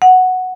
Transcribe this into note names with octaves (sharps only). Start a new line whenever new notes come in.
F#5